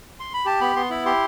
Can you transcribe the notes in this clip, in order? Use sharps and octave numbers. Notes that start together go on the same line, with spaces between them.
C6
B5
G4 A5
B3 B5
B3 C6
E4 B5
G4 C6